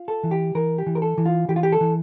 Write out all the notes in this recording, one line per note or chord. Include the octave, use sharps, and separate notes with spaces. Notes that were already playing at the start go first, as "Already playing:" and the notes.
Already playing: F4
A4
E3
G4
E3 A#4
G4
E3
A#4
A4
E3
F4
E3 G4
F4
G4
A4
E3